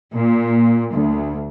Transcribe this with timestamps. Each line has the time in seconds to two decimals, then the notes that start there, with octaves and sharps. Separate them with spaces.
0.13 A#2
0.93 D2